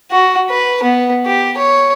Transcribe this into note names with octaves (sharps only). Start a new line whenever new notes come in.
F#4
B4
B3
G4
C#5